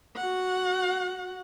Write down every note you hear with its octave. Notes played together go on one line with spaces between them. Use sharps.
F#4 F#5